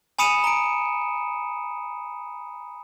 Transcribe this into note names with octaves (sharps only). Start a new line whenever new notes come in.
G#5 B5 D#6 C#7 D#7 E7
A#5 D7